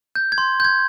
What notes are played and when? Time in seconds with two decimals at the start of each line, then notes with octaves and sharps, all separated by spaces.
0.15 G6
0.32 G#6
0.38 C6
0.60 G6 G#6